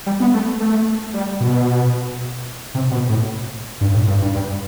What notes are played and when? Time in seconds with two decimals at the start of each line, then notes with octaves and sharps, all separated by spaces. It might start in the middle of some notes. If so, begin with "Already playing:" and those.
0.06 G3
0.20 B3
0.33 A3
0.60 A3
1.14 G3
1.40 B2
2.75 C3
2.91 B2
3.09 A2
3.81 G2
3.94 A2
4.08 G2
4.22 G2
4.34 G2